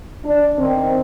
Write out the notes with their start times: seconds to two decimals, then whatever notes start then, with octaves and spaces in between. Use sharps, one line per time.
0.24 D4
0.59 D#3 C4